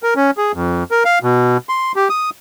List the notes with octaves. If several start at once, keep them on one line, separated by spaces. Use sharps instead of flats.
A#4
C#4
G#4
F2
A#4
F5
B2
C6
G4
D#6